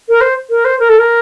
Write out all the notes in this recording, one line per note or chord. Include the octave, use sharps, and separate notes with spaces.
A#4
C5
A#4
C5
A#4
A4
A#4